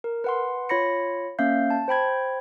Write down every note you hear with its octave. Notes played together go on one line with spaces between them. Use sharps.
A#4
B4 F#5 C6
F4 C#5 B5 A#6 C#7
A#3 C#4 E5 F5 G6
A5
C5 G5 B5 G#6